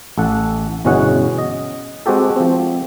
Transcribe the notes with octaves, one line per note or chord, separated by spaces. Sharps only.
A1 A4 F#5
G1 B2 E3 C#4 G#4 F#5
D#5
G#3 C4 F#4 G4 A4
F3 C4